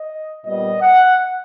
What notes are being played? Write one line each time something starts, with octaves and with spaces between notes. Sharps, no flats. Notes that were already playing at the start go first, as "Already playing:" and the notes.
Already playing: D#5
A#2 G3 B3 D#5
F#5